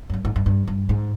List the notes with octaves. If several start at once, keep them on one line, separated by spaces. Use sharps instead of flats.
F#2
G2
G#2
G2
G2
G2
G#2